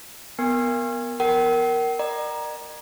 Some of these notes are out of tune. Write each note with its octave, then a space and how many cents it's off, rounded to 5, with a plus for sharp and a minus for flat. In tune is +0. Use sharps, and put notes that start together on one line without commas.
B3 +0 A#4 +0 G#5 -40
A#4 +0 G5 -45
D5 +45 A#5 +15